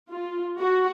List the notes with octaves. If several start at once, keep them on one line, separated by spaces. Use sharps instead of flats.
F4
F#4